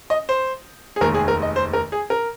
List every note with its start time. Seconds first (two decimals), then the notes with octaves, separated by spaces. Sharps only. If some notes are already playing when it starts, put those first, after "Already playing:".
0.10 D#5
0.29 C5
0.96 G#4
1.01 F1 D#2 D#3 G#3 A#4
1.15 G#4
1.28 A#4
1.42 D#5
1.56 C5
1.73 A#4
1.92 G#4
2.10 A#4